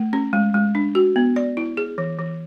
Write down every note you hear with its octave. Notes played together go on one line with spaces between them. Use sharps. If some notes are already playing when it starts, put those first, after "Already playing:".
Already playing: A3
C#4
G#3
G#3
D4
F#4
B3
D5
E4
G#4
E3
E3